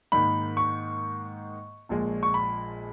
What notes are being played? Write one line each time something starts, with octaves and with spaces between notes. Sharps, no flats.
G#2 D#3 A#3 B5
C#6
A#1 A#2 F3 G#3
C#6
B5